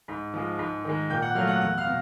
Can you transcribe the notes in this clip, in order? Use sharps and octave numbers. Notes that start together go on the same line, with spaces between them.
G#2
F3 G#3
G#2
D#3 G#3
A#2 G5 G6
F#5 F#6
F#3 A3 F5 F6
F#5 F#6
E2 F#5 F#6
F5 F6
B2